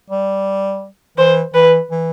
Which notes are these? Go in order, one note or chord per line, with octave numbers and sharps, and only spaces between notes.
G3
E3 C5
E3 B4
E3